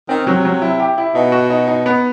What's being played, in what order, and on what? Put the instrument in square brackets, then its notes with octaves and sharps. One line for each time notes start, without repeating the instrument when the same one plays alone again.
[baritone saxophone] D#3 [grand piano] C4
[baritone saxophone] C3 [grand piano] F#3
[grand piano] F#3
E4
G4
E4
[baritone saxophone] B2 [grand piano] D#4
[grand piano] F#4
D#4
D#4
B3